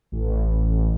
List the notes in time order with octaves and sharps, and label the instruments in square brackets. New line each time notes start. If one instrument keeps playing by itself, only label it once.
[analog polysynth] A1